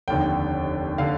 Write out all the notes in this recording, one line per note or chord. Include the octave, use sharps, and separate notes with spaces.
F1 D#2 D3 G5
D3 F5